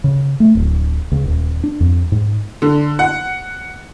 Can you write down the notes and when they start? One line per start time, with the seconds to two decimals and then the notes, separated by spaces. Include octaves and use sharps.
0.04 C#3
0.40 A3
0.55 D1
1.12 C#2
1.24 D#1
1.64 D4
1.80 F2
2.12 G#2
2.62 D3
2.99 F#5